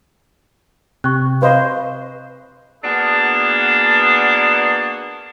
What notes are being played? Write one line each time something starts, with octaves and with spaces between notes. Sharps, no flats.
C3 C#6 F#6
B4 C5 D#5 F5
A#3 B3 D4 F#4 G#4